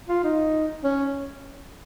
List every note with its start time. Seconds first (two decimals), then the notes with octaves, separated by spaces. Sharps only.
0.09 F4
0.24 D#4
0.84 C#4